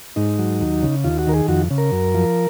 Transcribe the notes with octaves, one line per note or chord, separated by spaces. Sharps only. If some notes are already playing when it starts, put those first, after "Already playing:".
G#2 D#4
F#3
D#2
C#3
D#2 F4
F#4
D#3 A#4
G#4
F2 F#4
C#3
A#4
F#2
F3